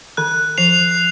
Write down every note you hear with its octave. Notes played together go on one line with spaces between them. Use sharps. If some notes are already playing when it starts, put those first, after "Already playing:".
D#3 F#6
F3 C7 F7